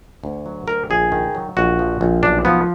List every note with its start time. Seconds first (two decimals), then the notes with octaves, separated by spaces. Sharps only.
0.24 D2
0.46 F#3
0.67 D2 A#4
0.90 A#1 G#4
1.12 D#3
1.35 F#3
1.57 A#1 F#4
1.79 F3
2.01 A#1
2.23 B1 D4
2.45 F3 B3